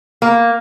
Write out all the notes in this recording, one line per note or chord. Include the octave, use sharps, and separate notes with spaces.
A#3